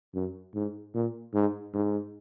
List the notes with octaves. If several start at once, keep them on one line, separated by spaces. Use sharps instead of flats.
F#2
G#2
A#2
G#2
G#2